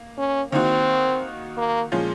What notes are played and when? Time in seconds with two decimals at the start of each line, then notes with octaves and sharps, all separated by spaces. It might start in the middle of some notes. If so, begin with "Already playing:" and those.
Already playing: A#3
0.18 C#4
0.52 D#3 A#3 C4 D#4 F#4
1.58 A#3
1.92 A#2 F3 G#3 C#4